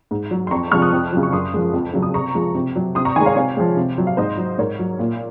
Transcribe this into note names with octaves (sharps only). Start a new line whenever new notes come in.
G#2
F#3
C6
F2 A#5 C#6
C3 F3 G#3 C#6 F6
D#6 F#6
F2
C#3 F#3
C#6
F#2 C6 D#6
F3 G#3
F2
C#3 F#3
D#6
C3 A#5 C#6
F3 G#3
C3
F#3
C3 C6 D#6
A#5 C#6
D#3 G#3 G#5 C6
C#5 F5
C3 C#5 F5
F3 G#3
C3
F#3
F5
G#2 C5 D#5
F#3
G#2 A#4 C#5
F#3
A#2